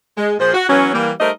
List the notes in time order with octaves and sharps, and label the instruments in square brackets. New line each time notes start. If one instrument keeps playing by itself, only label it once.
[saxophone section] G#3
A#2 F3 G#4 C5
F#4
E3 F#3 B3 C#4
E3 G3 A#3
G3 A3 D#4 A#4 C5 D#5